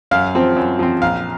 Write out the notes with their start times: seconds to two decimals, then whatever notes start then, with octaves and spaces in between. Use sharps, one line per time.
0.11 F#2 F5
0.35 F3 C4
0.56 F#2
0.79 F3 C4
1.02 A#1 F5